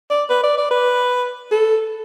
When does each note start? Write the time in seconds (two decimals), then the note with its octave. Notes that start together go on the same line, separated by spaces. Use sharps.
0.10 D5
0.30 B4
0.44 D5
0.58 D5
0.71 B4
1.51 A4